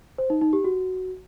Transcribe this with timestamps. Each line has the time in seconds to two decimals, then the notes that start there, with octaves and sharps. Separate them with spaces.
0.18 C5
0.30 D#4
0.41 D#4
0.53 G4
0.64 F#4